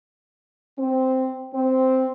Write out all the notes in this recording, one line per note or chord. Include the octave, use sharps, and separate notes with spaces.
C4
C4